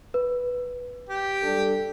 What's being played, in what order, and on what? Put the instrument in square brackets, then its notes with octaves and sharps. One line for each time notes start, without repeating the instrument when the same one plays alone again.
[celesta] B4
[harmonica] G4
[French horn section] G3 D4 A4